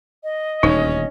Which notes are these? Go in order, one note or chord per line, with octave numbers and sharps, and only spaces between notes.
D#5
D#1 D2 C#4 D#4 C#5